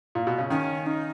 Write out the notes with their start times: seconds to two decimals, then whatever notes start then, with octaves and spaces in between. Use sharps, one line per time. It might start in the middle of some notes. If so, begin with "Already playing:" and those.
0.15 A#2
0.27 B2
0.38 C#3
0.50 D#3 C#4
0.86 D#4